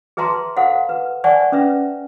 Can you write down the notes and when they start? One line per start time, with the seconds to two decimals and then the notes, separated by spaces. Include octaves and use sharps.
0.17 G#4 B4 E5 A5 A#5 C6
0.56 A4 C5 F5 F#5
0.89 B4
1.24 C5 D5 F#5 G#5 A5 C#6
1.52 C#4 B4 E5